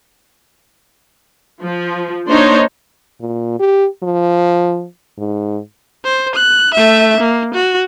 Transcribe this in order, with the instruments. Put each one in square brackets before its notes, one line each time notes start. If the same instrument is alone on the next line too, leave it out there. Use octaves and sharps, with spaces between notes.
[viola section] F3
A#3 D4 D#4 C5 C#5
[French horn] A#2
G4
F3
G#2
[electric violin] C5
F#6
A3 E5
A#3
F#4